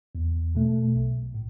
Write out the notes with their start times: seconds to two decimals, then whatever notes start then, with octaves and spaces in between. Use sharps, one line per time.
0.15 E2
0.55 B2 A3
0.95 B1
1.34 A2